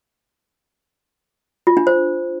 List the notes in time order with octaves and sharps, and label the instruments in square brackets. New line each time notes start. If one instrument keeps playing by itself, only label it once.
[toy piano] F4
D4
C5